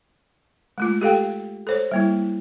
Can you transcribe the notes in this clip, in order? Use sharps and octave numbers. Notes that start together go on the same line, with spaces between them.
G#3 A3 F4
G4 A4 F5 G5
A4 C5 C#5
G3 A#3 E4